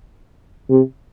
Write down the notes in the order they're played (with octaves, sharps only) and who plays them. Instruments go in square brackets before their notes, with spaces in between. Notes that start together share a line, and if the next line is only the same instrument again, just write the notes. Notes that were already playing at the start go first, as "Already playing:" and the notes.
[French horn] C3